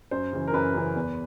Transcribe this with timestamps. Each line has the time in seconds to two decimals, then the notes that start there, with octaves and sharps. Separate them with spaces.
0.11 F#2 C5
0.33 C#3 E3
0.48 A#4
0.53 F#2 B4
0.75 C#3 E3
0.96 E2